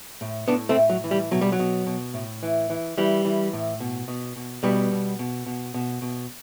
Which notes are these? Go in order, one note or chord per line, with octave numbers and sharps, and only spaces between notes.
A2
A2 B3 D4
A3 C4
A2
F#3
E3
G3
B2 F#3
G3
F#3
B2
B2
A2
E3
E3
E3 G3
E3
A2
B2
B2
B2
B2 G3 B3
B2
B2
B2
B2
B2